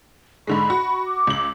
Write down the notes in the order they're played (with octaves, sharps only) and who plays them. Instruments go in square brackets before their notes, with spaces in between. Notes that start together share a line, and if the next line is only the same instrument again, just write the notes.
[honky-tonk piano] G#2 D3 G#3 [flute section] B5 C#6
[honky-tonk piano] F#4
[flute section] D6
[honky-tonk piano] C#2 F#7